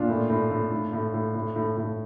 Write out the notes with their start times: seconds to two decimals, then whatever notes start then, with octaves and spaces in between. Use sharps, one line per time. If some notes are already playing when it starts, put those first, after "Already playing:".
Already playing: A#2 D4 F4
0.08 A2
0.30 A2
0.51 A2
0.72 A2
0.93 A2
1.14 A2
1.35 A2
1.56 A2
1.77 A2